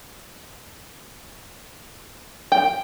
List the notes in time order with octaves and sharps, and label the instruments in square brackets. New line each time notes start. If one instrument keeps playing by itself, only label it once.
[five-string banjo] G5